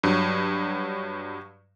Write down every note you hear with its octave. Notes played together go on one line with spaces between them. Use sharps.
G2 F#3